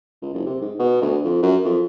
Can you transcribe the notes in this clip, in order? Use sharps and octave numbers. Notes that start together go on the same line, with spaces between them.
C#2
F#1
C3
G#2
B2
D2
F2
F#2
F2